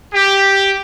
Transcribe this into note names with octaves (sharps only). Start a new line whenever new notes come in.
G4